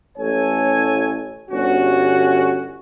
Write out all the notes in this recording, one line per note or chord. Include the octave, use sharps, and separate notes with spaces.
A1 A4 C#5 G#5
G1 C#4 F#4